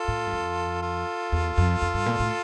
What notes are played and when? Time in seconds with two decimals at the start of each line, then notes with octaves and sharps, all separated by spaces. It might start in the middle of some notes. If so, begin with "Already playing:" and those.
Already playing: F4 A4
0.08 A2
0.27 G2
0.33 F2
0.82 F4 A4
1.32 E2
1.58 F2
1.82 F2
1.94 G2
2.06 A#2
2.20 A2